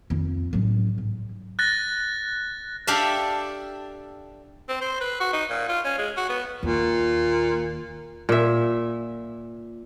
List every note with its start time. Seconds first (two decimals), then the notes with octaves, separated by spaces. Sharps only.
0.10 F2 D#3
0.53 A1 F#3
0.98 G#2
1.59 F#6 A6 A#6
2.87 D4 G4 A4 D5 E5 F5
4.69 C4
4.81 C5
5.00 B4
5.20 F#4
5.33 D#4
5.50 A#2
5.68 F4
5.85 C#4
5.98 G#3
6.17 F#4
6.29 B3
6.63 D#2 A#2
8.29 A#2 E5